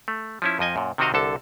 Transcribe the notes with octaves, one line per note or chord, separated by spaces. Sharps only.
A3
F3 C#4 E4
F2 F3 D#5 G#5
F#2 A#2
C3 D#3 C4 F#4 D#5 F5
C2 D3 A4 A5